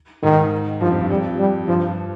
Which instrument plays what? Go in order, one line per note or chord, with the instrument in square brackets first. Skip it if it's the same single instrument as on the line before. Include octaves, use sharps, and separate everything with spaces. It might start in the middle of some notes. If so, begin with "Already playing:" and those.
[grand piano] G#2 [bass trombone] D#3
[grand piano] G2 [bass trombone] F3
[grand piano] F2
G2
[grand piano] F2 [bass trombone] G3
[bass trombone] G3
[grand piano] G2 [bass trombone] F3